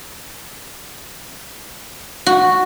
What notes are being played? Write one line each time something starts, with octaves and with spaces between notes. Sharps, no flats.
F#4